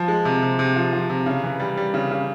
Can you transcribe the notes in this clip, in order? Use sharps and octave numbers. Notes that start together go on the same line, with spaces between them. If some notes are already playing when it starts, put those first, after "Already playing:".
Already playing: F3
G#3
C3
C3
C3
F3
F3
C3
C#3
E3
G3
G3
C#3
C#3